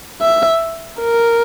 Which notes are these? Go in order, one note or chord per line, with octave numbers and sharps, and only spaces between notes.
E5
A#4